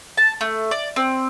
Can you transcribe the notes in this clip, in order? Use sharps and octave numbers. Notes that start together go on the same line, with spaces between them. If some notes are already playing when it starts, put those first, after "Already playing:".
A5
A3
D5
C4